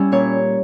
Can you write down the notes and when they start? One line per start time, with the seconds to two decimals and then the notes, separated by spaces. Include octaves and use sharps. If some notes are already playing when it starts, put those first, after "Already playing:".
Already playing: G3 C#4 E4
0.12 A#2 C#5